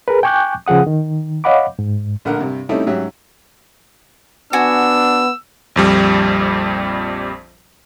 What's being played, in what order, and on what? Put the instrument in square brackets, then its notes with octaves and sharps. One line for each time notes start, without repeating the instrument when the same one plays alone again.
[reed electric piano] G#4 A#4 B4
G5 G#5 C#6 D6 F#6 G6
C#3 F3 G#4 F#5 D#6
D#3
C#5 D#5 F5 F#5 B5 D6
G#2
[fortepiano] A#1 D3 A3 A#4 F#5
G2 C3
G3 A3 C4 C#4 D#4 E4
G#2 F#3 C#4 G4 E5
[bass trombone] B3 [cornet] D4 [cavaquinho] F#4 G#5 [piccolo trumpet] E6
[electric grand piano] A#1 F2 G3